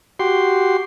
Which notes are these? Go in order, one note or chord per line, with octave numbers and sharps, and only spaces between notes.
F#4 G4 C6